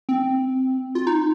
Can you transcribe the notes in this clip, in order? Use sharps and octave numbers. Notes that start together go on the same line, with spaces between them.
C4
F4
D#4